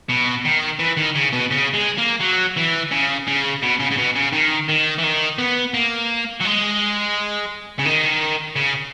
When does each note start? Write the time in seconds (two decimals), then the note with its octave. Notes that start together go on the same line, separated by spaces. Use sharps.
0.09 B2
0.45 D#3
0.79 E3
0.97 D#3
1.15 C#3
1.33 B2
1.51 C#3
1.74 G#3
1.98 A#3
2.21 F#3
2.57 E3
2.92 C#3
3.28 C#3
3.62 B2
3.79 C#3
3.91 C#3
3.97 B2
4.16 C#3
4.33 D#3
4.68 D#3
4.98 E3
5.03 D#3
5.39 B3
5.74 A#3
6.40 F#3
6.45 G#3
7.79 C#3
7.85 D#3
8.56 C#3